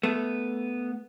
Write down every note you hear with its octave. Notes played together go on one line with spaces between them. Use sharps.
A3 B3